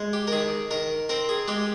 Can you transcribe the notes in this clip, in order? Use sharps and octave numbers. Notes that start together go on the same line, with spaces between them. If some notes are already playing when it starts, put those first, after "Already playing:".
Already playing: G#3
G4
A#4
D#3 G#4
D#3 A#4
C4 A#4
G#4
G#3 G4